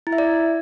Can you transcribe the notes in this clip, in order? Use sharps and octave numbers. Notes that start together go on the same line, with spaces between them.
E4
E5
D5